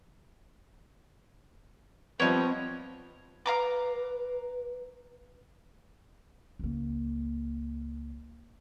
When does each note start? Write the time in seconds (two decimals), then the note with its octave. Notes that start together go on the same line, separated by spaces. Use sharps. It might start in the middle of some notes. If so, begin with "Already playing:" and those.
2.20 F3 G3 B3 C4 C#5 D#5
3.46 B4 F5 A#5 D6
6.59 C#2 A#3